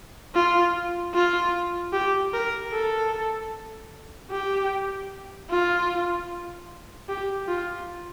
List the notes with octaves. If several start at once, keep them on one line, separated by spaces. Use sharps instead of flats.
F4
F4
G4
A#4
A4
G4
F4
G4
F4